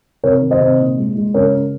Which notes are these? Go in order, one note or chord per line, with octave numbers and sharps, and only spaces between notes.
C3 A#4 C#5
D#3
C5 D#5
C3
A#2
G#3
G#3
C#3 A#4 C#5
C#4